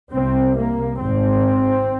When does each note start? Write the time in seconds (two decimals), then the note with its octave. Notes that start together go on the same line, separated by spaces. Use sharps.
0.12 C2 C3 C4
0.56 A#3
0.99 G#1 G#2 C4